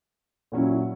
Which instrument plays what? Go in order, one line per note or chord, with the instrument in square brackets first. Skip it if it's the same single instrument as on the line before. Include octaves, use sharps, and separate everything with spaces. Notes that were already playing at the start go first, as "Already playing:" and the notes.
[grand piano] A#2 F#3 C#4 E4